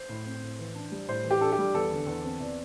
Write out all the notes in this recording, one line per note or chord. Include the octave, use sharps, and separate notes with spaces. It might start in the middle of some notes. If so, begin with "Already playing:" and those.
Already playing: C5
A2
C4
A2
E3
D4
G3
A2 C5
E3
G4
D4 A4
G4
G3
E2 A4
D3
E2
C4
E2 D5